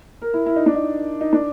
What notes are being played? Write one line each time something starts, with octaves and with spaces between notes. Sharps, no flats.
A#4
E4
E4
D#4
D4
D#4
D#4
D4